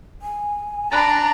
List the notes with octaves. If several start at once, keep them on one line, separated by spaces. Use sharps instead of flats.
G#5
D4 A#5 B5 F#6 A6